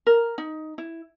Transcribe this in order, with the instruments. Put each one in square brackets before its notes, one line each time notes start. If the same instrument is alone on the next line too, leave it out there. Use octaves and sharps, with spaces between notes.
[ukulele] A#4
D#4
E4